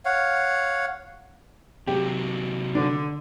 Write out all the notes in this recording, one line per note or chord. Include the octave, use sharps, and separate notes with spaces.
C#5 F5 F#5
C3 F#3 G4
D3 D4